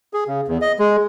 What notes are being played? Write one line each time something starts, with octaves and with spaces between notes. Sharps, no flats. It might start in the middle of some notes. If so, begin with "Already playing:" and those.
G#4
C#3
E2
D#5
G#3